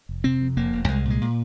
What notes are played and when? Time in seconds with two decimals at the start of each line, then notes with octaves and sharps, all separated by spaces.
0.09 F1
0.24 C3 C4
0.41 F2
0.56 F1 A#3
0.73 F1
0.88 C2 G#3
1.05 A#2
1.10 G#3
1.21 A#2